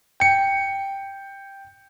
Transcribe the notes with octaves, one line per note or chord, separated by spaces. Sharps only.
G5 C#7